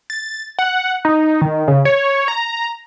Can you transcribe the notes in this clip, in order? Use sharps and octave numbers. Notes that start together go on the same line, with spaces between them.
A6
F#5
D#4
D#3
C#3
C#5
A#5